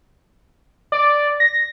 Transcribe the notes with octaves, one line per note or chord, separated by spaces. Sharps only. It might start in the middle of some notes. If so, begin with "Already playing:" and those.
D5
A#6